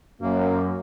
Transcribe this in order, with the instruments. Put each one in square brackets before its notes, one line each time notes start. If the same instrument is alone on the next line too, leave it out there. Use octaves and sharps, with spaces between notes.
[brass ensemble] F#2 [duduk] A#3